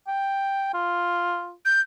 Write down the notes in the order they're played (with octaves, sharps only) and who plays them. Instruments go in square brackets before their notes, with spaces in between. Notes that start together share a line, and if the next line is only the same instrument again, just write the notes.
[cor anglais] G5
F4
[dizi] G6